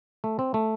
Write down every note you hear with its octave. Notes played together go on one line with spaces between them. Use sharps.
A3
C4
A3